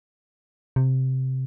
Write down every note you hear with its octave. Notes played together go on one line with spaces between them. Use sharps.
C3